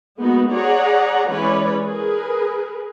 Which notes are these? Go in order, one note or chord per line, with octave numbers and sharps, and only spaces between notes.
G#3 A#3 B3 D#4 F#4
G#4 C#5 D5 F#5 A#5
E3 G#3 C#4 B4 C#5 D5
G#4 A#4 B4